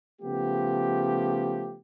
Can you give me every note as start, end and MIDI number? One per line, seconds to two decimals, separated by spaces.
0.21 1.78 49
0.21 1.78 53
0.21 1.78 57
0.21 1.78 59
0.21 1.78 67